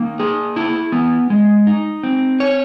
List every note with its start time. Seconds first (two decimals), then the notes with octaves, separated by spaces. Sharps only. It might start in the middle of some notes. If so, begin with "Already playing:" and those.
Already playing: A#3 D#4
0.20 G#4
0.56 E4
0.92 B3
1.30 G#3
1.67 D#4
2.03 C4
2.40 C#5